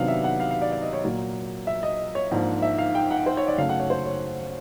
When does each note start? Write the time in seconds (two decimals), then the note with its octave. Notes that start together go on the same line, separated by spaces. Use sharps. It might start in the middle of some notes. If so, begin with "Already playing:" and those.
Already playing: C3 D#3 F#3 B3 D4 F5 F#5
0.08 E5
0.24 F#5
0.40 F5
0.51 F5
0.61 D5
0.72 D5
0.82 D#5
0.93 C#5
1.04 A#2 F#3 A#3
1.67 E5
1.83 D#5
2.15 C#5
2.31 G#2 F3 A#3 D4
2.62 E5
2.78 F5
2.95 G5
3.11 F#5
3.26 C5
3.37 C#5
3.48 D5
3.58 F#2 C#3 F#3 A3 C#4 F5
3.69 F#5
3.80 C#5
3.90 C5
4.06 C#5